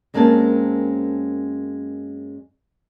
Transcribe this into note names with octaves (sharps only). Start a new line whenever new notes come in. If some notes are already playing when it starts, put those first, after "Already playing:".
F#2 G#3 A#3 C4 C#4 A5